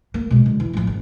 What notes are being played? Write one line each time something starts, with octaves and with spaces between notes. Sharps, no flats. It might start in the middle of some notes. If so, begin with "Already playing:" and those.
A#3
B2 G#3
F#2 D3
E3
A1 F3
G#1